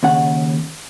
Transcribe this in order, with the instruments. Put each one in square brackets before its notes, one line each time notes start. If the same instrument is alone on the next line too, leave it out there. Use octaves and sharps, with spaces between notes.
[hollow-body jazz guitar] D#2 C#3 F#5